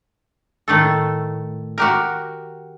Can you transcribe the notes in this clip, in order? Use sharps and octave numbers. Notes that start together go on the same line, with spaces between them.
A2 D#3 A3 A4
F#4 G4 A#4